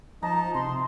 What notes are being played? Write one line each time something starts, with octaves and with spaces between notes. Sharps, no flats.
F3 D#4 A5 A#5
C3 C6